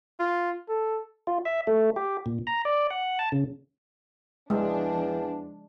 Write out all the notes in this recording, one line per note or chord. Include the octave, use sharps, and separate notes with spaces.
F4
A4
F4
E5
A3
G4
A#2
A#5
D5
F#5
A5
C#3
E2 F3 G#3 D4